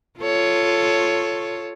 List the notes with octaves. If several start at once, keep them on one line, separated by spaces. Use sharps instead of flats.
F4 A4 C#5